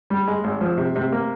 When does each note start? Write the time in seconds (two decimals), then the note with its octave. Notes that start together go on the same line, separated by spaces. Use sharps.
0.10 G3
0.28 G#3
0.44 G#1
0.61 F3
0.77 C3
0.96 C3
1.12 A#3